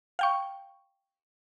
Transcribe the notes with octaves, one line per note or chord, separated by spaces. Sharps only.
F5 G5 C#6